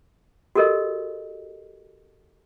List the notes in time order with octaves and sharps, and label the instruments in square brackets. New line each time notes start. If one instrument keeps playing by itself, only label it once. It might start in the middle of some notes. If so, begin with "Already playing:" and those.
[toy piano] F#4 G4 A4 A#4 D#5